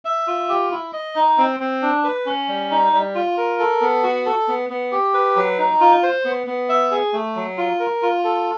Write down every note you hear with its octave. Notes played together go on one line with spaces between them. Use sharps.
E5
F4
G4
E4
D#5
D#4
C4
C4
D4
B4
C#4
G3
D#4
G3
F4
A#4
A4
B3
F#4
A4
B3
B3
G4
B4
F#3
D#4
F4
C5
B3
B3
E5
G#4
A3
F#3
F4
A#4
F4
A4